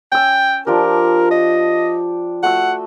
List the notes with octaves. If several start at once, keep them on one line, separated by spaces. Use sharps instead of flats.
C#4 G5 E6
F3 D4 G4 A#4
D#5
A3 F#4 F#5 E6